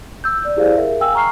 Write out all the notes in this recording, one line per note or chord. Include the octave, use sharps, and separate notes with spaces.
E6 G6
D5
E4 G4 G#4 C5 D5 F5
G#4 A#4 E5
F5 G5 G#5 E6
A#5 C#6 F6 C7